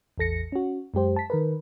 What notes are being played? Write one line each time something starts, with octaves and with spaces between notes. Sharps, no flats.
A1 E2 A4 A#6 C#7
C#4 F#4
F#2 G#3 G4 C5
A5 B6
D#3 A#4 B4